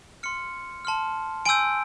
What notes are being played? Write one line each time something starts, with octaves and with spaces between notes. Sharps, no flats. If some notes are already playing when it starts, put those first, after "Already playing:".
C6 F6 C#7
A5 C6 F6
G#5 C6 E6 G6 D7